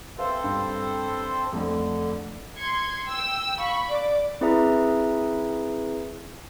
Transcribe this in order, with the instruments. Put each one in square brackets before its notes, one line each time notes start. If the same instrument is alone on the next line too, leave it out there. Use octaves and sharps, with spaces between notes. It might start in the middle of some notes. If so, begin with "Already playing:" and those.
[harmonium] C4 A4 C5 [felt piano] B4 E5 F5
[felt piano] G2
[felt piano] F2 A3 [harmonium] D3
[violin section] C6 G#6 C#7
G5 E6
[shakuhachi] F5 [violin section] B5 C#6
[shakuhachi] D5 [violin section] D6
[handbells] C4 E4 G#4 B4 E5 A#5